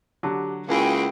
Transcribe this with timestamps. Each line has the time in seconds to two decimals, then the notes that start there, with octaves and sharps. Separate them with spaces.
0.23 D3 F#3 G4 A5 D6
0.69 C#2 A#3 E4 F#4 G#4 G5 A5 B5